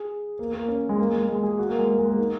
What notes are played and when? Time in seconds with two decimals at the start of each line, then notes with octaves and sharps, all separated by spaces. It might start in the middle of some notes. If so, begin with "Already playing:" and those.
Already playing: G#4
0.39 A#3
0.53 A#3
0.68 C#4
0.89 G#3
0.98 A#3
1.13 G#3
1.28 G#3
1.43 G#4
1.59 F#4
1.69 A#3
1.78 G#3
1.89 A#3
1.99 G#3
2.09 A#3
2.19 D#4